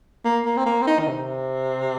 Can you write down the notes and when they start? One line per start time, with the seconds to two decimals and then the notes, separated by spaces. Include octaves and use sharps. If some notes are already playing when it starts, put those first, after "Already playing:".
0.25 A#3
0.45 A#3
0.57 C4
0.66 A#3
0.82 C4
0.87 D#4
0.99 D#3
1.08 C3